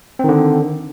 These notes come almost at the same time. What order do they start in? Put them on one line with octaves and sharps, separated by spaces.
C4 D#3 D3